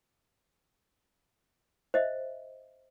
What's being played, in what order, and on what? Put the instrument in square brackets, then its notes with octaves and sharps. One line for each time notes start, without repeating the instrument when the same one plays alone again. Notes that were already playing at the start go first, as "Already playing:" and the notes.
[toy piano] C5 D#5 E5